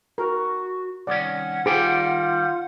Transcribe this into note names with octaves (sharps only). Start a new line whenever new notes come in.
F#4 A#4
C2 D#3 C#4 D5 F#5
D#3 G3 F4 G4 G#4 C5 D5